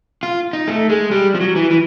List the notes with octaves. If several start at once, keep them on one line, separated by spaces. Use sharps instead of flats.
F4
D#4
A3
G#3
G3
F3
F#3
E3
E3